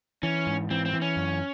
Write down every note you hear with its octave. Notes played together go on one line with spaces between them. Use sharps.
E3 C#4
G#2
E3 C4
C4
E3
C#4
F#2